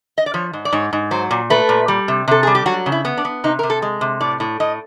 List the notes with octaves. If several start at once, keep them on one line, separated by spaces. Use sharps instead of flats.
D#5
D5
F3 C#5
G#2
D5
G#2 C#5
G#2
F#3 C5
A#2
A3 B4
A#2
G3
C3
C3 A4
G3 G#4
G4
F#3 F#4
C#3
E4
B3
D4
B3
C3 D#4
C3 A#4
A4
G#3
C3
A2 D5
A2
A2 D#5